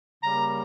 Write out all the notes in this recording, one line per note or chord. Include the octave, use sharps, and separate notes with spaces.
C#3 G3 A#3 A#5